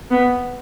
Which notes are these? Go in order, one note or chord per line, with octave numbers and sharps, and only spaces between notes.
B3